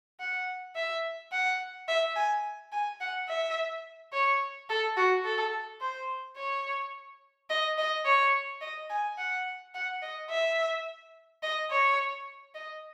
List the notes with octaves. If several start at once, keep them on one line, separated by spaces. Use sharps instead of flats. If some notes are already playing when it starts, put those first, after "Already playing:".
F#5
E5
F#5
E5
G#5
G#5
F#5
E5
C#5
A4
F#4
A4
C5
C#5
D#5
D#5
C#5
D#5
G#5
F#5
F#5
D#5
E5
D#5
C#5
D#5